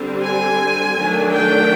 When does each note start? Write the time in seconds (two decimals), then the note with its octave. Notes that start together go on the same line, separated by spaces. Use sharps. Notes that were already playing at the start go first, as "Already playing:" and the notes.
Already playing: D3 G3 C4
0.24 G#5
0.98 D#3 F#3 A3 D4
1.34 G5